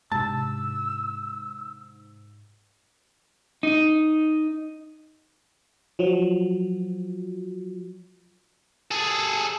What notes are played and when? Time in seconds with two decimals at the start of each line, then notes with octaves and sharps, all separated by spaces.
0.12 G#2 C3 D4 A5 E6
3.63 D#4
5.99 F3 F#3
8.91 G#4 A4